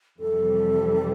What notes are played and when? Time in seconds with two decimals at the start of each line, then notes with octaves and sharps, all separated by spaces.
0.20 F2 C3 E3 G3 A4